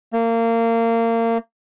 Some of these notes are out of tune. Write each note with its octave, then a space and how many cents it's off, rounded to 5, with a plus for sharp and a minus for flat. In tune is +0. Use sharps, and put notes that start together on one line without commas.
A#3 -25